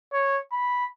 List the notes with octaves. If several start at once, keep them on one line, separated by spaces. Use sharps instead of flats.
C#5
B5